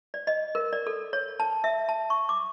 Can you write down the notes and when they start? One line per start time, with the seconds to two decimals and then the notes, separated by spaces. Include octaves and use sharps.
0.14 D5
0.27 D#5
0.55 A#4
0.73 D5
0.87 A4
1.13 C#5
1.40 A5
1.64 E5
1.89 A5
2.10 C#6
2.29 D6